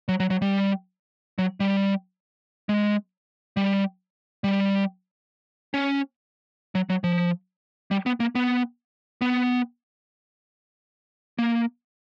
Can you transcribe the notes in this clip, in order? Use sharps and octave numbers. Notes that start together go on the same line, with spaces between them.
F#3
F#3
F#3
G3
F#3
G3
G#3
G3
G3
C#4
F#3
F#3
F3
G3
B3
A#3
B3
B3
A#3